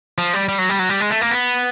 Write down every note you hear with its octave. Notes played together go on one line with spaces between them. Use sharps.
F3
G3
G3
F#3
G3
F#3
G3
G#3
A3
A#3
B3